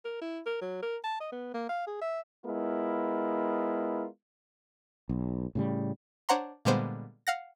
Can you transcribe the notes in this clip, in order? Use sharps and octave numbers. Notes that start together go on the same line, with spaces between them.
A#4
E4
A#4
F#3
A#4
A5
D#5
B3
A#3
F5
G#4
E5
G#3 B3 E4 F4 A#4
B1
A2 C#3 G3
D4 C5 C#5 F#5 A#5 C6
A#2 D3 G3 G#3 B3 C5
F5 F#5 A#6